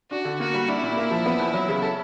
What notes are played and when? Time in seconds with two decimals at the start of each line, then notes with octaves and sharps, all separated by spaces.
0.11 D4 F#4
0.25 D3
0.40 A#3 F#4
0.54 G3
0.68 D4 E4
0.83 A#2
0.97 A#3
1.11 F3
1.26 B3
1.39 E2
1.54 F#3
1.69 C#3
1.82 A4